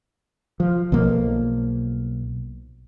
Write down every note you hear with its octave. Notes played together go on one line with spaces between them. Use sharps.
F3
B1 F3 A#3